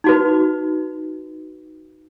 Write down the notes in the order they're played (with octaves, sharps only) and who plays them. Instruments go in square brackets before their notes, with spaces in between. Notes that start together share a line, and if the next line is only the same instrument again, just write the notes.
[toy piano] D#4 F#4 B4